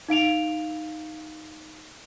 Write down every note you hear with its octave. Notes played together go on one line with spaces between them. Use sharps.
D#4 F5 D7 F7